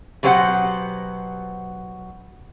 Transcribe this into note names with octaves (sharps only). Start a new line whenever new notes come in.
B2 F#3 G4 C5 D#5 F#5